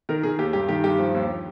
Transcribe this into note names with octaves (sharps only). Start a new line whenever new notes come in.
D#3 A#4
D#3 G#4
D#2 G4
G2 G4
D#3 G4
G2 G4
F3
D#2